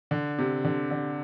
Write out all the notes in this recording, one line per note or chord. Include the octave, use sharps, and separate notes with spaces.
D3
C3
D3
D3